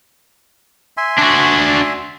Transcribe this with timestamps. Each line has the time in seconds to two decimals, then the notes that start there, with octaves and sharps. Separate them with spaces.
0.97 E5 G#5 C6
1.18 D4 F#4